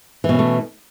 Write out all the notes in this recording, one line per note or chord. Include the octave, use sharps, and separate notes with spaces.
B2 E3 A3 C#4